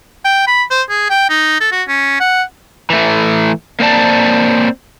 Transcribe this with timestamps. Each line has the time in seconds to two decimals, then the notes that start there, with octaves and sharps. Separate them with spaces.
0.24 G5
0.47 B5
0.70 C5
0.89 G#4
1.10 G5
1.29 D#4
1.60 A4
1.72 F#4
1.88 C#4
2.20 F#5
2.90 E3 A3
3.80 A#3 C4 D5 A5